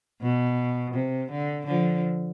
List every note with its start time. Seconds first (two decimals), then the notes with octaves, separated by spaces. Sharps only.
0.22 B2
0.94 C3
1.31 D3
1.67 D3 F3